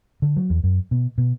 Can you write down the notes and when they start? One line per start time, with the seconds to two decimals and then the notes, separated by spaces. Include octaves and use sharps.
0.22 D3
0.36 F#3
0.50 E2
0.64 F#2
0.91 B2
1.18 B2